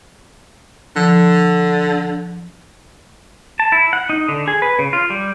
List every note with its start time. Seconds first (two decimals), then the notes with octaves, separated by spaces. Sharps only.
0.96 D3 F3
3.60 A5
3.72 E4
3.93 F#5
4.09 D#4
4.28 D3
4.48 G#4
4.62 B4
4.79 C#3
4.93 F4
5.10 G3